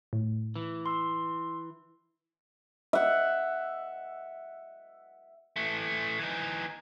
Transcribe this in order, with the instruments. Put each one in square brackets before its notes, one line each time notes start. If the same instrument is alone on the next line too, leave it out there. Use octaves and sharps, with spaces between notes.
[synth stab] A2
[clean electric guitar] E3
[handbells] C6 E6
[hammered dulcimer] E5 F#5
[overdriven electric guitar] E3 A3
E3 D#4